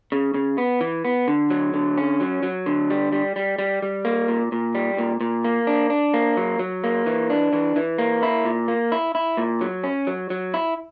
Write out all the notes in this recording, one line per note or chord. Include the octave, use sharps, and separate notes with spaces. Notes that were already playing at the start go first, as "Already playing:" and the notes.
C#3
C#3
B3
E3
B3
D3
F#3
D3
C#4
F#3
F#3
D3
G3
G3
G3
G3
G3
A#3
A#2
A#2
G3
A#2
A#2
A#3
D4
D4
A#3
F#3
F#3
A#3
E3
D4
E3
E3
A#3
E4
A#2
A#3
E4
E4
A#2
F#3
C#4
F#3
F#3
E4